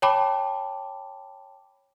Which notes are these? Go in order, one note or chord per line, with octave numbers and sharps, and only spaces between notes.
C#5 G5 A5 B5 D6